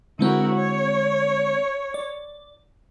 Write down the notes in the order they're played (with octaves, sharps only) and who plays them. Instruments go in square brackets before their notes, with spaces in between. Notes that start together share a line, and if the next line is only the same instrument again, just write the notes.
[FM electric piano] D3 G#3 C4 [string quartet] E4 F#4 A#4
[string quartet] C#5
[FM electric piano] D5